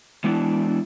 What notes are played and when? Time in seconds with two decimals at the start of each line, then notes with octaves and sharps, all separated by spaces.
0.24 E3 G#3 B3 D4 E4 F#4